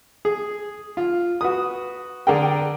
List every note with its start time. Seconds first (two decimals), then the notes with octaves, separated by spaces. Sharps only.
0.25 G#4
0.97 F4
1.41 F#4 B4 D#6
2.27 D3 G#4 A#4 G5